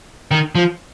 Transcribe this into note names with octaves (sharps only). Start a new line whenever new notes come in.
D#3
F3